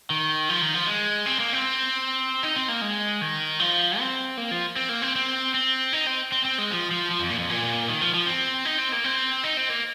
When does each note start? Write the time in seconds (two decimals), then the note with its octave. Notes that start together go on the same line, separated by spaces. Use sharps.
0.10 D#3
0.49 F3
0.62 D#3
0.74 F3
0.87 G#3
1.26 C4
1.40 A#3
1.53 C4
2.43 D#4
2.56 C4
2.68 A#3
2.81 G#3
3.21 D#3
3.60 F3
3.99 C4
4.37 A#3
4.51 F3
4.76 C4
4.89 A#3
5.02 C4
5.16 C4
5.54 C4
5.93 D#4
6.07 C4
6.32 C4
6.45 C4
6.58 G#3
6.71 F3
6.91 F3
7.11 F3
7.20 F2
7.30 A#2
7.39 F2
7.50 A#2
7.88 D#3
8.01 F3
8.14 F3
8.26 C4
8.65 D#4
8.78 C4
8.92 A#3
9.04 C4
9.44 D#4
9.57 C4
9.70 A#3